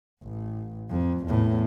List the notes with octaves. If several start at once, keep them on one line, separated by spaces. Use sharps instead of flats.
A1
F2
E2 A2